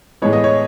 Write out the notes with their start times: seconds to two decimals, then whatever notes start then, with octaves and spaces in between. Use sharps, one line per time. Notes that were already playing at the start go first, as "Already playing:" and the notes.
0.22 A2 E3 G#3 B3 C#5
0.33 D#5
0.44 C#5